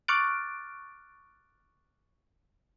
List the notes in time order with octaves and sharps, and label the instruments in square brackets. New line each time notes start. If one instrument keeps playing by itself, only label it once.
[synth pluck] C#6 D6 F6 F#6 A6 D7